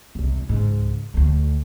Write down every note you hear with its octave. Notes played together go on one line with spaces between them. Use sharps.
E1 C2
C#2 G#2
D2 A3